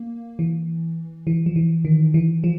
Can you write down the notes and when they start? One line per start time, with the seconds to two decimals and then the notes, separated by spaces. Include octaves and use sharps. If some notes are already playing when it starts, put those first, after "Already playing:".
Already playing: A#3
0.39 E3
1.27 E3
1.46 F3
1.56 E3
1.85 D#3
2.14 E3
2.44 F3